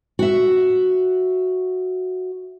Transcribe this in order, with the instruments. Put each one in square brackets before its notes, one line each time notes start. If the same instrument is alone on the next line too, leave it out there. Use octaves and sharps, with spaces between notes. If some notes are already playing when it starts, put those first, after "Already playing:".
[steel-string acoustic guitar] F#4 E5